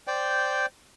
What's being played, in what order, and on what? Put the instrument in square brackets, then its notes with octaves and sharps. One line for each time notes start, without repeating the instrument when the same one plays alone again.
[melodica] C5 D5 G5